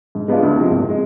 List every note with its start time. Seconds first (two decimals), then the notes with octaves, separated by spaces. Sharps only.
0.15 G#2
0.28 G#3 B3 D4 F4
0.43 D2
0.57 C3 F3 G#3
0.71 G#1
0.90 G#3